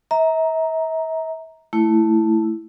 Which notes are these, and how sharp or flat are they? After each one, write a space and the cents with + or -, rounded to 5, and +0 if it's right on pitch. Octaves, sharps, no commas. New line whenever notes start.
E5 -40 A#5 +0
A3 +0 E4 +0